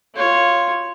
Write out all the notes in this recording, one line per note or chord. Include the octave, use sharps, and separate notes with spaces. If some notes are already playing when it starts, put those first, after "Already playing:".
F4 C#5